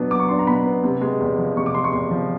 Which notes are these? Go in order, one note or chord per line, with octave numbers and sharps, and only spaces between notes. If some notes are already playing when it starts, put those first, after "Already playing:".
Already playing: B2 F#3 B3 D4
F#3 D6
C#6
D4 C6
A#5
B2 B5
B3
C3
G#3
E2
F3
C3 C#6
D6
G#3 C6
C#6
E2 C6
F3